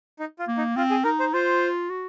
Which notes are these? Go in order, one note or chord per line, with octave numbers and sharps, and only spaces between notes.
D#4
F4
A#3
D#4
C4 F4
G#4
D#4 A#4
C5
F4 C5
F#4